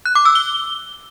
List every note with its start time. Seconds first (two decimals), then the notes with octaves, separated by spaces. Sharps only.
0.05 F#6
0.15 D6
0.25 E6
0.35 G7